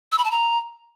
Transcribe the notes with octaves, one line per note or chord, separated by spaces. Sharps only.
E6
B5
A5
A#5